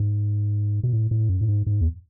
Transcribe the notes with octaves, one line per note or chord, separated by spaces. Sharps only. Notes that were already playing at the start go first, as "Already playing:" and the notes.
Already playing: G#2
B2
A2
A2
F#2
A2
G#2
G#2
E2